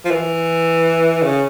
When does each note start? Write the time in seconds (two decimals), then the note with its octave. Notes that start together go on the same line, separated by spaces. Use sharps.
0.05 F3
0.11 E3
1.23 C#3